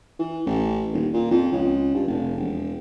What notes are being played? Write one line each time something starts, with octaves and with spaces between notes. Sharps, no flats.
E3
A1
D#1
A#2
F2
C#2
G2
F1
E1